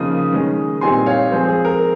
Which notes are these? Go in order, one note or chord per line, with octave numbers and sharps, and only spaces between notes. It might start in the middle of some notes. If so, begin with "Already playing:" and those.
Already playing: C#3 F3 A#3 D#4 D#6
D#3 G#3 C#4
A#2 G3 C4 D#4 G#5 C6
C#5 F5
F3 G#3 C4 G#4 C5
G#4
A#4